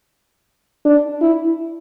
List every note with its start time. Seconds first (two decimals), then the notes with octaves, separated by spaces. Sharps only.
0.85 D4
1.21 E4